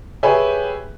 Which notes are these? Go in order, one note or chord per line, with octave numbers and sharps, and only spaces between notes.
G4 G#4 B4 C#5 E5 G#5